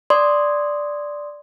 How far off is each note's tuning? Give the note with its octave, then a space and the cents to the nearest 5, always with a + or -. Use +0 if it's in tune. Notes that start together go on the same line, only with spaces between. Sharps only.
D5 +0 C6 +0 D#6 +0